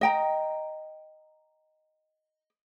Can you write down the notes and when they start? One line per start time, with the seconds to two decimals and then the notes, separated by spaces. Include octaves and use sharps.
0.01 D#5 G5 A#5